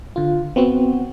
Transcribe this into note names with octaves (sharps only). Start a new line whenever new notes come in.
D3 F4
B3 C4 F#4